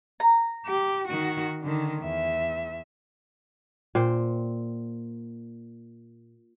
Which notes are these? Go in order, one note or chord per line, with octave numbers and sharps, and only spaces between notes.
A#5
G4
D#3 F#4
D3 D#3
E2 E5
A#2 C5 G5